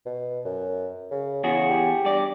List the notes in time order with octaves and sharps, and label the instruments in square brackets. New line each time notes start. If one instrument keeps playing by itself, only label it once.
[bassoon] B2
F#2
C#3
[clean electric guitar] E2 F#4 G#4 [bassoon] C#3
[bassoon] G4
[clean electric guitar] G2 D5